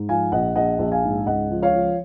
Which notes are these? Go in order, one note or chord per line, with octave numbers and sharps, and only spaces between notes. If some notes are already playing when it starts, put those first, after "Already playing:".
Already playing: G#2
F3 F5 G#5
A#1 D#5 F#5
A#1 D#5 F#5
A#1
F5 G#5
G#2
C#2 D#5 F#5
F3
C#5 F5
F3